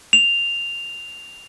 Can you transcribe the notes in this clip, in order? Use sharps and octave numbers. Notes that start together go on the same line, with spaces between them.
F7